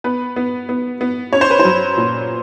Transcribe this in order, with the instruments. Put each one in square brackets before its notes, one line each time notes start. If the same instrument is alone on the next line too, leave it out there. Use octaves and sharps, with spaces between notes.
[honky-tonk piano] B3 B4
B3
B3
B3
C#4 C#5
C5
B4
C5
F#3
A#2